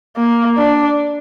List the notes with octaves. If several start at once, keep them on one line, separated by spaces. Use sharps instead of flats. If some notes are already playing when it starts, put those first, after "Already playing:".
A#3
D4